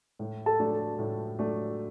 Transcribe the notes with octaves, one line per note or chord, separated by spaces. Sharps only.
A2
A4 A5
F#3 A3 D4
A2
F#3 A3 D4